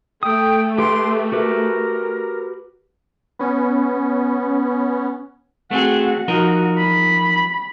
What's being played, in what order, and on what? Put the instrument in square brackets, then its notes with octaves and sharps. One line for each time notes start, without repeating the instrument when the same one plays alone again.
[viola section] A3 [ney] G5 [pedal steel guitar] D#6
[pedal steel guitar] G4 B4 G5 [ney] C6
[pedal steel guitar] F#4 G4 B4 [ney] A#4
[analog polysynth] B3 C#4
[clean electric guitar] A3 C4 G#4 [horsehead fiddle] F#4 F#5
[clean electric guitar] F3 D#4 A#4 [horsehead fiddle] F#4
[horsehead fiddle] B5